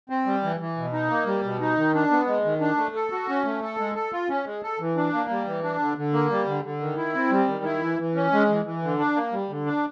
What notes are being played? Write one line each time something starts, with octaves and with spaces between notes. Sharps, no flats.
C4
G3
E3
E3
B2
D#4
A#3
G3
B2
D#4
D#3
D4
B3
G#3
D#3
D4
A3
A4
F#4
C#4
A3
A4
G#3
A4
F4
C#4
G#3
A4
E3
D4
A#3
G3
E3
D4
D3
D3
A#3
G3
D3
D3
D#3
E4
C4
G3
D#3
E4
E3
E3
C#4
G#3
E3
E3
D3
D4
A#3
G3
D3
D4